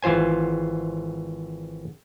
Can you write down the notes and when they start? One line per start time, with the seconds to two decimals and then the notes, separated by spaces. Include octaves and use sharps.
0.02 G#1 E3 F4 C5 G#5